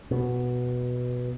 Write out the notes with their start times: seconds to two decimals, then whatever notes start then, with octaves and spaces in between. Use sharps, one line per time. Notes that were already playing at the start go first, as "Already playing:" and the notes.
0.11 B2